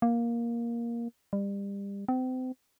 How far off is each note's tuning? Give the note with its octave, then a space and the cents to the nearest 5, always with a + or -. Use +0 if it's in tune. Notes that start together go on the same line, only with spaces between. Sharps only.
A#3 +10
G3 +30
C4 -35